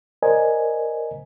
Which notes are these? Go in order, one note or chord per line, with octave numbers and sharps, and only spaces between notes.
A#4 C5 D5 D#5 G#5